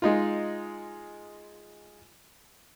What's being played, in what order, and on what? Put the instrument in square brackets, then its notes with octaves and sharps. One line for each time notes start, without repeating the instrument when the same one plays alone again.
[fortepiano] G#3 D#4 F4